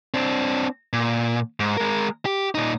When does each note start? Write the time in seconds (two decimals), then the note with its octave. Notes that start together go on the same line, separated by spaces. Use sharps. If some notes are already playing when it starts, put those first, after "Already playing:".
0.14 C4 D4
0.93 A#2
1.60 G#2
1.77 G#3 A#4
2.25 G4
2.55 A#2 D#4